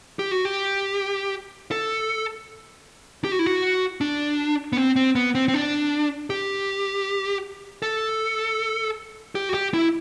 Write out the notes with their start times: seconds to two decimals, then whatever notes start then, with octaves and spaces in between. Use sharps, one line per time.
0.19 G4
0.31 F#4
0.45 G4
1.71 A4
3.24 G4
3.32 F#4
3.39 E4
3.46 F#4
4.01 D4
4.73 B3
4.77 C4
4.96 C4
5.15 B3
5.35 C4
5.48 C4
5.54 D4
6.30 G4
7.82 A4
9.35 G4
9.49 F#4
9.54 G4
9.74 E4